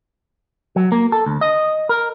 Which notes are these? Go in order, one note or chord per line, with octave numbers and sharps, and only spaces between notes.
F#3
A#3
A4
D2
D#5
A#4